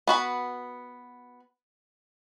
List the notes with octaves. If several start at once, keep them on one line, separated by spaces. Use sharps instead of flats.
B3 F#4 B4